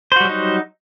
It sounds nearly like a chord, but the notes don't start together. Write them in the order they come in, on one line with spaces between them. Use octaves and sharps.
C5 F#4 G3 F#3 D#4